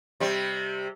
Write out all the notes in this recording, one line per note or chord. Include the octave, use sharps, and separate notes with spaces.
C3 G3